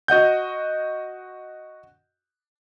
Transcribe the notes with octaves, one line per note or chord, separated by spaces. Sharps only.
F#4 D#5 F#5 G6